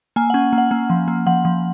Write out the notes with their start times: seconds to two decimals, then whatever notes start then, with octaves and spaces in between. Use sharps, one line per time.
0.16 A#3 G#5
0.30 C#4 F#5
0.53 A#3
0.58 F#5
0.71 A#3
0.90 F3
1.08 A#3
1.27 F3 F#5
1.45 F3